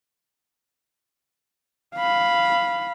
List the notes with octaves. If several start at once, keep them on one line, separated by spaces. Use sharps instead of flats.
F5 B5